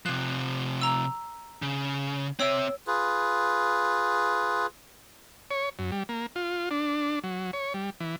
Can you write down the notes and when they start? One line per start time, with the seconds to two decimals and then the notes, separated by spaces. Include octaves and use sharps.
0.06 C3 F3 F#6
0.81 A#5 E6
1.62 C#3
2.40 C4 C#5 E5 E6 D7
2.87 F4 G#4 B4
5.51 C#5
5.79 F#2
5.92 G3
6.09 A#3
6.36 F4
6.71 D4
7.24 F#3
7.53 C#5
7.74 G3
8.00 E3